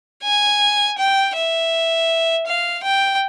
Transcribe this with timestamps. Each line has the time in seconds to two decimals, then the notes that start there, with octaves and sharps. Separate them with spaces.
0.23 G#5
0.98 G5
1.35 E5
2.46 F5
2.83 G5